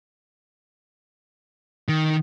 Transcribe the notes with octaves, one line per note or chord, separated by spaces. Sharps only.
D#3